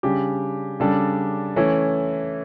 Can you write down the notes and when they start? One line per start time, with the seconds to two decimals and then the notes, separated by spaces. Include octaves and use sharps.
0.03 C#3 G3 D4 G4
0.80 C#3 G3 D4 A4
1.56 E3 A3 C#4 E4